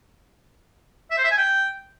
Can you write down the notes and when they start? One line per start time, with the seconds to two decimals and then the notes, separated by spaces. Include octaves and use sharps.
1.11 E5
1.18 C5
1.24 E5
1.31 G#5
1.37 G5